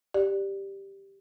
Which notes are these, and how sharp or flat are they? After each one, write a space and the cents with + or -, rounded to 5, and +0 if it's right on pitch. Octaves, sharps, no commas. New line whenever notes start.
G4 +0 D5 +5